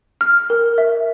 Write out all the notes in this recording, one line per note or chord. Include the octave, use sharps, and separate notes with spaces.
F6
A#4
E5